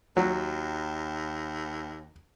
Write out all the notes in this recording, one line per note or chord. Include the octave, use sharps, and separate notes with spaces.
D#2 F#3